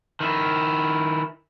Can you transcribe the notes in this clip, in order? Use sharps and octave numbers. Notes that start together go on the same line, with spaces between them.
D#3 E4